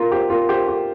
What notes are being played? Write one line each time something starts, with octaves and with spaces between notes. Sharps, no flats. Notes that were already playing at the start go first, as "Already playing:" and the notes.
Already playing: F4 A#4
G4 C5
F4 A#4
G4 C5
G4